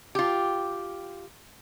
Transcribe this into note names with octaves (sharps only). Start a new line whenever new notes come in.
F4 G4